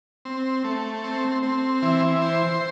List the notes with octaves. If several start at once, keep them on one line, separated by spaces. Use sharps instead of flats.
C4
A3
C4
C4
E3
C5